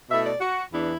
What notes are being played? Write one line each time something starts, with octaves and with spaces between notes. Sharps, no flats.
B2 A3 E4 E5
D5
F#4
E2 E3 B3 D4 E4